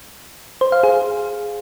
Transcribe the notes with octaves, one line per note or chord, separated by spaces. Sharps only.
C5
F5
G#4